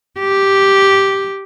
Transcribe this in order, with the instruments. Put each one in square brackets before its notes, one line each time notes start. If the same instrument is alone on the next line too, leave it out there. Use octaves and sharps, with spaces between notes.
[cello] G4